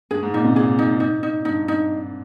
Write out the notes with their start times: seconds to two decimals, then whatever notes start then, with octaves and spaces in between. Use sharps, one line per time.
0.11 G2 G#4
0.22 G#2
0.34 A#2 D#4
0.44 C3
0.56 A#2 G#4
0.79 D#4
1.00 D#4
1.23 D#4
1.45 G2 D#4
1.68 D#4